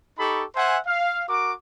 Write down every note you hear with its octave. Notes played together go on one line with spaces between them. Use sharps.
D#4 G4 A4 B5 C#6
C5 E5 F#5 G#5
F5
F#4 A#4 D6